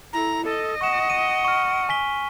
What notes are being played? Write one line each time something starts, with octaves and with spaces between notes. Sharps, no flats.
E4 A4 A#5
A4 D#5
F#5 C#6 E7
D#7
C#6 F6
G#5 B6 G7